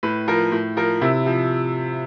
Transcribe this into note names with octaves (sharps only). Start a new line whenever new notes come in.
A2 B4
F3 A#4
A2
F3 A#4
C3 E4
F3